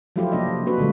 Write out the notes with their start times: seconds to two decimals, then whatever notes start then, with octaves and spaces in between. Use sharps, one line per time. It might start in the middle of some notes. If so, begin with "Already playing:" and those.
0.16 F3 F#3 A3 E4 F4 G4
0.32 C3 A#3 D4 G4 D#5
0.48 C3
0.66 A#3 D4 F#4 B4
0.78 A#2 D3 G3 G#3